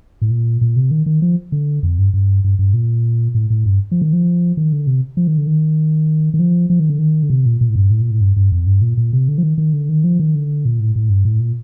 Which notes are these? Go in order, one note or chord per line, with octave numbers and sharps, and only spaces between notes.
A2
A#2
A#2
C3
D#3
D#3
F3
D3
F2
G2
G2
G2
G2
A#2
A2
A2
G2
F3
D#3
F3
D#3
D3
C3
F3
D#3
D3
D#3
D#3
F3
F3
D#3
D3
D#3
D3
C3
A#2
A#2
A2
G2
A2
A#2
A2
G2
G2
F2
G2
A#2
A#2
C3
D3
F3
D#3
D#3
D3
D#3
F3
D#3
D3
A#2
A2
A2
G2
A2
A#2